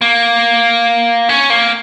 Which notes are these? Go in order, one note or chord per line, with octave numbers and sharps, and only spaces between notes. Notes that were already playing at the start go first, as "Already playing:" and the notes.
A#3
C#4
A#3